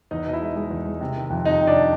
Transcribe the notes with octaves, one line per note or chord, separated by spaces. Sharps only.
E2 D#4 D#5
B2 D#5
E4 E5
G#3
G#3
E2
G#3
C3
D#3
F2
C3 D#4 D#5
C3
D4 D5